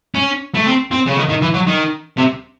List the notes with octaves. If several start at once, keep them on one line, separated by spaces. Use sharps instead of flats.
C#4
A3
C4
C4
C#3
D#3
D#3
E3
F#3
D#3
C3